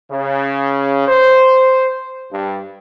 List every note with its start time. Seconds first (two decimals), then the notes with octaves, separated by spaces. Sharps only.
0.11 C#3
1.08 C5
2.32 G2